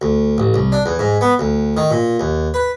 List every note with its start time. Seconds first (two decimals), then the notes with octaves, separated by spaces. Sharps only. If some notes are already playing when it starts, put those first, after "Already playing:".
0.02 D2
0.38 A1
0.54 C2
0.72 D4
0.86 E2
0.99 G#2
1.21 B3
1.39 D2
1.77 D#3
1.91 A#2
2.20 D#2
2.54 B4